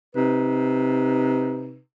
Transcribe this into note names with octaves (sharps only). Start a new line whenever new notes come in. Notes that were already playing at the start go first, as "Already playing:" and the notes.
C3 D#4 B4